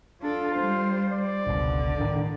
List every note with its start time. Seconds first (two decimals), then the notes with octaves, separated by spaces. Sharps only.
0.22 D4 F4 A4
0.55 G3 C5
1.13 D5
1.47 G1 C#2 B2 D3
2.00 A2 D#3